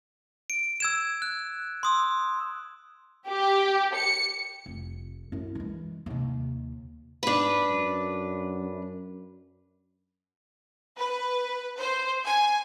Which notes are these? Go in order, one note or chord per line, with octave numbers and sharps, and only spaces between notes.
D7
E6 G#6 E7
F#6
C6 D#6 E6
G4
C#7
F1
F#2 E4
E3 G#3
D#2 C3
G#2 D4 B4
F#2
B4
C5
G#5